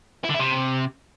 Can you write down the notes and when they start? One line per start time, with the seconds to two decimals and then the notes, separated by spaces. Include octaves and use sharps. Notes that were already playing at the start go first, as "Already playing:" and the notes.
0.24 E4
0.29 D3
0.34 E4
0.39 C3